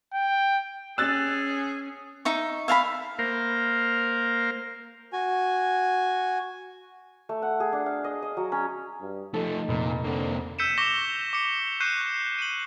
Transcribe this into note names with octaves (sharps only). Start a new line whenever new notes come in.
G5
C#4 G#4 E6 F#6 A6
D#4 E5 C#6
E5 F5 A5 B5
A#3 A#4 C5 F5
F#4 G#5
A3
F#5
G#4
D4
F5
D#5
D#5
F#3
C#4
G2
F3 A3 D#4 A4
F1 A#2
D3 A#3 C4
E6 G6 B6 C#7 D#7 E7
C#6 D6 A#6 E7 G7
D6 C#7
C#6 F#6 G6 C7 D#7
D#7 F#7